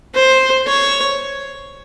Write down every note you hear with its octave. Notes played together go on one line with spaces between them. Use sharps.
C5
C#5